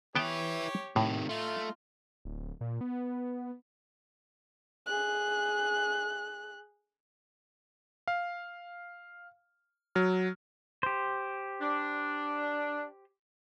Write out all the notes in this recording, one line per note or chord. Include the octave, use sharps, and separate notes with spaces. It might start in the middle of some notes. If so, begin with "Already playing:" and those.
B3 E4 G4 B4 C#5 G5 A5
A2 C3 D#3
A3 D#4 F4
D1
A#2
B3
G#4 F#6
F5
F#3 F6
G4 C5
D4